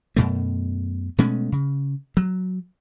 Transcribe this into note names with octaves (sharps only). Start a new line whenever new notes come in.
F#2 B2 A3
B2 G#3 A3 C#4
C#3
F#3